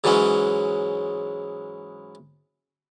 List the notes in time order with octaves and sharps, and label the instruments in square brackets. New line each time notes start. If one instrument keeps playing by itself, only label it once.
[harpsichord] G#2 E3 F#3 G#3 C#4